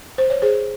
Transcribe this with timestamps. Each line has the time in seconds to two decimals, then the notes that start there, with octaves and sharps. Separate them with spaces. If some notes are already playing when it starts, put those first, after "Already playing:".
0.18 C5
0.30 C#5
0.42 G#4 C5